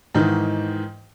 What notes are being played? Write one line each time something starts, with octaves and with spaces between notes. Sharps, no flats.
G#2 D#3 E3